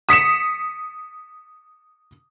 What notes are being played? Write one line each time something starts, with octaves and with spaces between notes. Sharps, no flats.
D#6 B6 C#7 E7